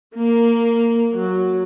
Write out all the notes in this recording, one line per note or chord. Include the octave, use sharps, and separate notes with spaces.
A#3
F#3